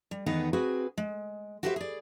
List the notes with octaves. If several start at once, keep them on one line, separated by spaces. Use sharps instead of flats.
G3
E2 D#3 B3 D#4 B4 F#5
C4 F#4 G#4 B4
G#3
F#4 G4 B4 C5 D#5 E5
G#4 D5